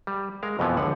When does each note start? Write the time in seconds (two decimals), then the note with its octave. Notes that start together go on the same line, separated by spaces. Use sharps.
0.07 G3
0.43 G#3 A#4 F5
0.59 F2 B2 E3 F3 B3
0.77 C#2 D3 F3 F#5